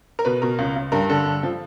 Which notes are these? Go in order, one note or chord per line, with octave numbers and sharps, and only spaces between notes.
A#4
B2 B4
B2 A#4
C#2
C#2
G2 A#4
D3 A4
G2
F3